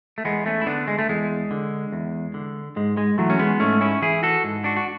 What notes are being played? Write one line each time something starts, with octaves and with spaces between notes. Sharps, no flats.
A3
E2 G#3 B3
A3 C#4
E4
D3 B3 D4
G#3
A3
E2 G#3
D3
E2
D3
G#2 G#3
G#3
E3 F#3 A3
C#4
G#3 B3
G#2 A3 C#4
C#4 E4
E3 E4 G#4
F#4 A4
G#2
D4 F#4
F#4